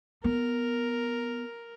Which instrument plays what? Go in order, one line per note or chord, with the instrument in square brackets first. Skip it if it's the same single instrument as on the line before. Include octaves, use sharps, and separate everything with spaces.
[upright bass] B3 [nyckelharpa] A#4